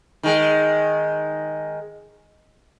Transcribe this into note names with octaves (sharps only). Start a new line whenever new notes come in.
D#3 G#3